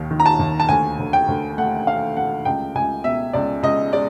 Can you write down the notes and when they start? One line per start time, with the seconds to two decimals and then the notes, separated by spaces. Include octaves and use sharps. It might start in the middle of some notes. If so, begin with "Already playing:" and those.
Already playing: D#2 D#3
0.11 D#3
0.20 A#5
0.26 A5
0.39 D#2
0.60 A5
0.69 D2 G#5
0.99 D2
1.13 G5
1.28 D2
1.58 A3 F#5
1.87 A3 F5
2.17 A3 F#5
2.45 C#2 G5
2.75 C#2 G#5
3.04 B2 E5
3.33 C#2 D5
3.63 C#2 D#5
3.93 G#3 D5